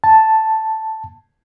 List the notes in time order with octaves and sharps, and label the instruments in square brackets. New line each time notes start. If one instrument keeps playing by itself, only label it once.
[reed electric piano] A5